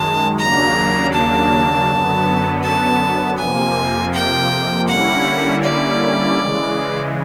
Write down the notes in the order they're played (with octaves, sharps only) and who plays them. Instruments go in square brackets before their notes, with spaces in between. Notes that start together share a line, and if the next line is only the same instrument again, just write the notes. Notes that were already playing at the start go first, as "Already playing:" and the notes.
Already playing: [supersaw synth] F#2 D#3 G#3 [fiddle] A5
[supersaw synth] D#2 C#3 F#3 A#3 D4 [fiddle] A#5
[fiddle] A5
[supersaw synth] F#2 D3 F#3 B3
[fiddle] A5
[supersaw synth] F2 C3 F3 A#3 [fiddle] G#5
[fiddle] G5
[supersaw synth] D3 G3 A#3 C#4 E4 [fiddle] F#5
[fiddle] D5
[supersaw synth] C#3 E3 G#3